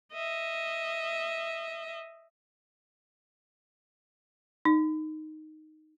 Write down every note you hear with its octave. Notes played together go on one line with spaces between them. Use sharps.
D#5 E5
D#4